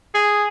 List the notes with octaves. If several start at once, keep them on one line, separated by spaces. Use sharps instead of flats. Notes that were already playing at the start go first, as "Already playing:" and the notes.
G#4